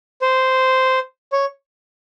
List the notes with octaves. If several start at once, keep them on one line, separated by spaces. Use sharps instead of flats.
C5
C#5